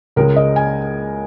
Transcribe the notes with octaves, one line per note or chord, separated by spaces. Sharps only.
C#2 C#3 G#3 A#4
D#5
G#5